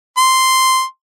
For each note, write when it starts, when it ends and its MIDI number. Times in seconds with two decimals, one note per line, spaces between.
0.18 0.83 84